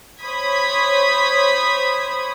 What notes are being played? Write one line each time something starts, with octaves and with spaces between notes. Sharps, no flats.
C5 C#5 B5 D#6 G#6 B6